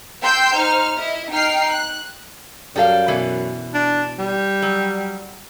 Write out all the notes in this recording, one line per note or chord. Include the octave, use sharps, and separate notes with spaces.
G5 C6 E6 G6
D#4 C5 F6
E4 D#5
D#4 G5 F6 C7
F#6
F#2 G3 A4 F5
B2 E3
D4
G3
F#3